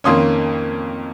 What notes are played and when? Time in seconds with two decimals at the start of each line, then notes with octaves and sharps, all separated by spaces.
0.04 F2 D#3 A#3 C#4 C6 D#6